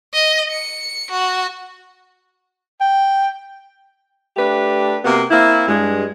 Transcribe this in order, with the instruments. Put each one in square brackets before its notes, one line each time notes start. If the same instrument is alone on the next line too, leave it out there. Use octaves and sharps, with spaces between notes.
[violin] D#5
C#7
F#4
[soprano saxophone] G5
[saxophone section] A3 D4 G4 B4
C3 A#3 B3 F#4
A#3 C4 E4
G2 G#3